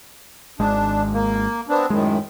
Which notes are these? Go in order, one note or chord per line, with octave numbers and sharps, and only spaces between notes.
G#1 G#3 D4
A#3
B3 C4 D4
F#2 A2 D#3 G#3